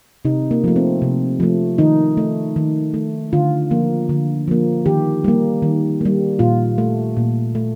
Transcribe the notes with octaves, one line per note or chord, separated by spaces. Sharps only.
C3 D#4
A#3
F3 A3
C4
C3
F3 A3
D#3 D#4
A3
D#3
A3
D3 F4
F3 A#3
D3
F3 A#3
D#3 G4
G3 A#3
D#3
G3 A#3
A#2 F4
A3
A#2
A3